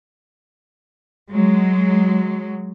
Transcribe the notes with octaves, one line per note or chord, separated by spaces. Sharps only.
F#3 G#3